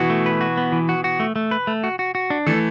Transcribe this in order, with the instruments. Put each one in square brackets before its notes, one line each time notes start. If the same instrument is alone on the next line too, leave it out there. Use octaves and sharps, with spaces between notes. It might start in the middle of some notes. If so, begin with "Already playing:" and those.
Already playing: [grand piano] B2 E3 [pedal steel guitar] F#4
[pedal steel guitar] A3
B4
F#4
B3
E3
F#4
F#4
A3
A3
B4
A3
F#4
F#4
F#4
D4
[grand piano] E3 A3 [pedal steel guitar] A4